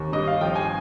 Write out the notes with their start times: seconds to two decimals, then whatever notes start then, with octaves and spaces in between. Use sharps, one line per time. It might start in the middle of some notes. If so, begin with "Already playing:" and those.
Already playing: D#2
0.12 G2 D#5
0.27 F5
0.41 F3 G5
0.55 G#5